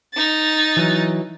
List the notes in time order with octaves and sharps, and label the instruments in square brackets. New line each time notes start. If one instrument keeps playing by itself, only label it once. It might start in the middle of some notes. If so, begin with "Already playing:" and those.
[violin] D#4 A6
[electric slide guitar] E3 F#3